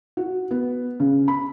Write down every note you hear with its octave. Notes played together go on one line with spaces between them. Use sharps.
F#4
B3
C#3
B5